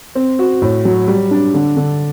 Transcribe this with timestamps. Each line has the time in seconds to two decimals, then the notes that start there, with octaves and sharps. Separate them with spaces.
0.15 C4
0.39 F#4
0.62 A2
0.85 F#3
1.08 G3
1.31 D4
1.54 D3
1.77 D3